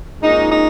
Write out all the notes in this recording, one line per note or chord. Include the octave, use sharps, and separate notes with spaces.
A#2 G#3 C#4 D#4
D#4